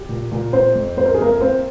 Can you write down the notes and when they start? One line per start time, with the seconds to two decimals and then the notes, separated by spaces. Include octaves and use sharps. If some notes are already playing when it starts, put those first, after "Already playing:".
Already playing: G4
0.09 A#2
0.32 A#2
0.53 C3 C4 C5
0.75 F2
0.97 F2 C5
1.06 A#4
1.14 G#4
1.20 C3 A#3 A#4
1.41 A#3 C4 C5